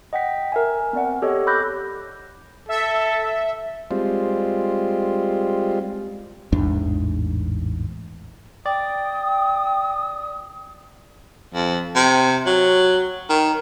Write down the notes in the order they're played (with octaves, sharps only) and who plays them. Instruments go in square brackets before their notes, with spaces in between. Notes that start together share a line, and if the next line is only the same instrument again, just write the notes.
[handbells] D#5 F#5 G5 B6
A#4 E5 G#5
B3 C4 D5 F#5
G4 A4 C#5 D#5
B5 D6 E6 F#6 G6 A#6
[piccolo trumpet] A4 [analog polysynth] E5
[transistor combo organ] G3 G#3 C4 F4
[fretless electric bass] A1 E2 G#2 D4
[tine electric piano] D5 [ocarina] G5 [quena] D#6
[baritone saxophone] F2
C3
F#3
D#3